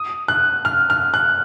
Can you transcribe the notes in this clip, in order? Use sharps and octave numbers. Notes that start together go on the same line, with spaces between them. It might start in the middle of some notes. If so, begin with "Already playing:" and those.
Already playing: D#6
F#6
F6
F6
F#6